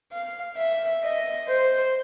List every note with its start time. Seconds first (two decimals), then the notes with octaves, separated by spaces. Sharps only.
0.12 F5
0.58 E5
1.04 D#5
1.50 C5